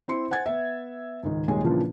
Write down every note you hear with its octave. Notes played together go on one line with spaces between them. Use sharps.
C4 E4 C6 C#7
C5 F#5 G#5 G#6 A6
B3 E5
C#2 G#2 D#3
D#1 D#3 G#3 G#4 G#5
A#2 C#3 E3 F3 D4 F4